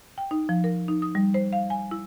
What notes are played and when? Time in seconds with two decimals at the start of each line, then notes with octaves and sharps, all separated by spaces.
0.18 G5
0.31 D#4
0.49 F3
0.64 A#4
0.88 D#4
1.02 D#6
1.15 G3
1.34 C5
1.53 F5
1.70 G#5
1.91 E4